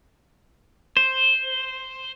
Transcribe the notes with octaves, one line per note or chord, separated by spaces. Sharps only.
C5